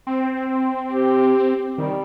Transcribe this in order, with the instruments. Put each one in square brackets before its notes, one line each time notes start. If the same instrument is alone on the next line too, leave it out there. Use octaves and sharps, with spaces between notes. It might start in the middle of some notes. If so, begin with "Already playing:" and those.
[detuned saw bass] C4
[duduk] G4
[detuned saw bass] D#3 [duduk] G3